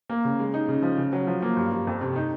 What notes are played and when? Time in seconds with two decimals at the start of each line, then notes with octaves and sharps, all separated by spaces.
0.10 A#3
0.25 C#3
0.39 G#3
0.54 D#4
0.69 C#3
0.83 F3
0.98 C#3
1.13 F#3
1.27 F3
1.42 A#3
1.57 G2
1.72 G2
1.87 F2
2.01 C3
2.16 D#4